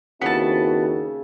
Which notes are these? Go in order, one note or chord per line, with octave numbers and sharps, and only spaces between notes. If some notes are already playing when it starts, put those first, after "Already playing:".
D#2 C#3 B3 C4 E4 F#4 E5 A5